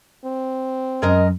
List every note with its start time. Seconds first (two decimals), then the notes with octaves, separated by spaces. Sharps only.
0.25 C4
1.02 F#2 G#3 A#4 D#5